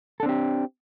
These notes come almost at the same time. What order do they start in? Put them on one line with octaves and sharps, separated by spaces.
A4 D4 C4 G4